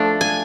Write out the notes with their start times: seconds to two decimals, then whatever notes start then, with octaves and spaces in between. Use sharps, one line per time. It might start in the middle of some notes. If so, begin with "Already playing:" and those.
Already playing: F3 A3 D4
0.21 G#5